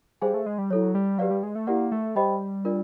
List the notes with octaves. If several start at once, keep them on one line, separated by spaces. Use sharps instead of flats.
G3 G#4 C5 F5 G#5
A3
G#3
G3
F#3 E4 A4 C#5
G3
F#3 G4 B4 D5 F5
G3
G#3
A3
A#3 E4 G4 A#4 D5 F#5
A3
G3 G4 C5 D#5 G5 B5
D4 F4 A#4 D5